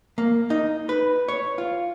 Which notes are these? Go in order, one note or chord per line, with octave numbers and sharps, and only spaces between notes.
A#3
D#4
B4
C#5
F4